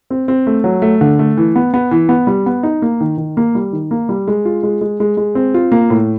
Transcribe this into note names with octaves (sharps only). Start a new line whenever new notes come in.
C4
C4
A3
F#3
A3
D3
A3
E3
B3
B3
E3
B3
G3
B3
D#4
A#3
D#3
D#3
A#3
G3
D#3
A#3
G3
G#3
F4
G#3
G#3
G#3
G#3
C4
F4
A#3
A2